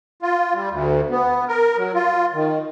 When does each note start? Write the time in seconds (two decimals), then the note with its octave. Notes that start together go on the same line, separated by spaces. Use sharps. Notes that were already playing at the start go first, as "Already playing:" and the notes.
0.22 F4
0.55 G3
0.71 D2
1.10 B3
1.48 A#4
1.77 F#3
1.95 F4
2.34 D#3